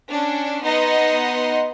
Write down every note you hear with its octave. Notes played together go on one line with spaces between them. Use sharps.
C#4 D4
B3 D#4 D#5 F#5 C6